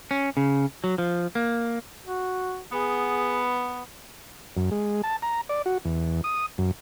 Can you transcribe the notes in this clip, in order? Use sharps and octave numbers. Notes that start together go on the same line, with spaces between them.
C#4
C#3
F#3
F3
A#3
F#4
B3 G#4
F#2
G#3
A5
A#5
D5
F#4
E2
D#6
F#2